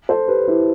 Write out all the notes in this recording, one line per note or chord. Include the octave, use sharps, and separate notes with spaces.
A4 C5
G4 B4
E4 G4